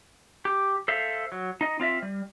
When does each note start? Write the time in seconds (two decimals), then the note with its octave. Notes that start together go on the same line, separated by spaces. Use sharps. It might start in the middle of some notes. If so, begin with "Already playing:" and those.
0.45 G4
0.88 A4 C5 E5 F5
1.32 F#3
1.61 D#4 D#5
1.80 C4 F4 D#5 E5
2.02 G3